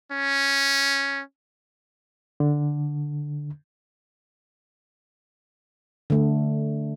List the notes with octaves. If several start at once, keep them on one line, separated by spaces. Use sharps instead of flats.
C#4
D3
D3 A3